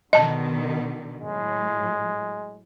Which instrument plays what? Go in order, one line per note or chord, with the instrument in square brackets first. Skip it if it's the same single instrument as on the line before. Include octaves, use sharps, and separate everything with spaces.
[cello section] B2 D3 D#3 [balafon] D#5 A5
[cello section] A2 F#3 [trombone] G#3